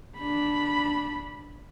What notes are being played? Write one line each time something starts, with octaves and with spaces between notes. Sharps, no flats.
D4 B5